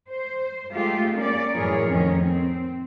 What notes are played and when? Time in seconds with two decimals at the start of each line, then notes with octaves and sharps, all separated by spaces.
0.10 C5
0.72 G#3 A3 F4 G4
1.16 A#3 C#4 D5
1.52 F#2 A2 E3 G#4 A#4 C#5
1.85 F2 D#3 C#4
2.23 C4